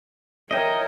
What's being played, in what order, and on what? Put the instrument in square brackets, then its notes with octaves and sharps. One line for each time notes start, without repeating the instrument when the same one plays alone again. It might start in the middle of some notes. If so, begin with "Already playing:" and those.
[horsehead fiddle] A#4 C#5 [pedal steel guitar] D#5 [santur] E5 G5